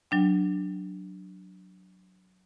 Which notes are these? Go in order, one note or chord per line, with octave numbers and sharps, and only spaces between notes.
F#3 D4 G5